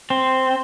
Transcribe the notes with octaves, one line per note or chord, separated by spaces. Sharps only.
C4